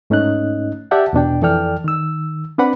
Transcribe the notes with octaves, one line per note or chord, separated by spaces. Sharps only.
G#2 A3 C#4 D#4 D#5 F#6
G4 D5 E5 F#5 G5 A5
E2 B2 D4 G5
F2 E3 A4 D5 G5 F6
D#3 E6
C4 D4 B4 D5 F#5 B5